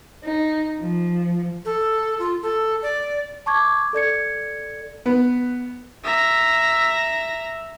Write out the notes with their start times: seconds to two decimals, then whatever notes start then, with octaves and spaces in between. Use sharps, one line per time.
0.23 D#4
0.78 F3
1.65 A4
2.19 F4
2.42 A4
2.82 D5
3.46 A5 C#6 D6 G#6
3.93 A4 D5 G#6 C#7
5.06 B3 B4
6.04 E5 A#5